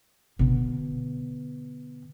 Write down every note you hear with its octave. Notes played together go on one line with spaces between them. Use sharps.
B2 D3